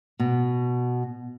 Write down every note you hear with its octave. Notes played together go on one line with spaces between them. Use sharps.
B2